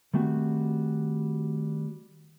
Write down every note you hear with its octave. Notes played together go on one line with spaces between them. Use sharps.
D#3 G3 A3 C4 F#4